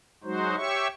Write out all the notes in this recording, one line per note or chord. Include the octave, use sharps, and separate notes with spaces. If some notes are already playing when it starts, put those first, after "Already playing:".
F#3 G#3 D#4 F#4 C5
G4 C#5 E5 C#6